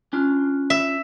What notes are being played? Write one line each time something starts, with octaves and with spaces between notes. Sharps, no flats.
C#4 D4 F4
E5